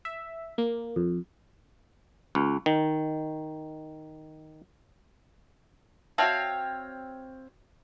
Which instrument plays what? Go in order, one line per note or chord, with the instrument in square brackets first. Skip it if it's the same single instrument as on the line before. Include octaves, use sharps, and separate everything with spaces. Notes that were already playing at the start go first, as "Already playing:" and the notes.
[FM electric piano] E5
A#3
F2
[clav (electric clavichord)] C#2
D#3
[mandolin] C4 C#5 F5 [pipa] F#4 E5 A5